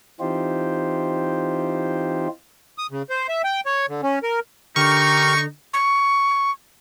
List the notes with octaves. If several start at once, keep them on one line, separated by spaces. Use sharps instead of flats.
E3 C4 D#4 F4 G4 C5
D#6
C#3
C5
E5
G5
C#5
D3
C#4
A#4
D3 D#4 G4 A#4 C#6 F6
C#6